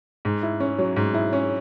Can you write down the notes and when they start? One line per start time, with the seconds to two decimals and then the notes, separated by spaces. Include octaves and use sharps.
0.25 G#2
0.43 E4
0.60 C#4
0.78 F#3
0.96 G#2
1.14 E4
1.33 C#4